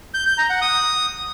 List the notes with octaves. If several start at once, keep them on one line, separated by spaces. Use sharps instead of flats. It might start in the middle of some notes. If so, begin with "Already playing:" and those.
G6
G6
A#5
F#5
D#6